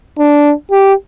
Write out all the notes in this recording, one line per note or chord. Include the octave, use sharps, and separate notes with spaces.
D4
G4